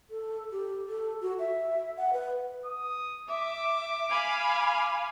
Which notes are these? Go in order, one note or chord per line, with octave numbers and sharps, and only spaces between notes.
A4
G4
A4
F#4
E5
F#5
B4
D#6
E5 D6
F5 G#5 B5